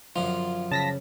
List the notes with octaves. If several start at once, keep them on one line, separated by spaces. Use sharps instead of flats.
F#2 D3 F3 F4
C#3 A5 A#6 B6